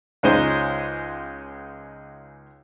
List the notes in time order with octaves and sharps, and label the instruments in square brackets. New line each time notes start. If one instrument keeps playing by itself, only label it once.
[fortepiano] C#2 G#3 C#4 D#4 C5